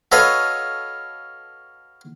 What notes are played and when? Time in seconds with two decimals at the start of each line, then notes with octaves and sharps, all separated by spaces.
0.12 F#4 A4 B4 C#5 D#5 F5